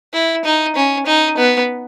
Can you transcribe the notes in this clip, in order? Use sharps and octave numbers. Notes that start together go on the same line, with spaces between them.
E4
D#4
C#4
D#4
B3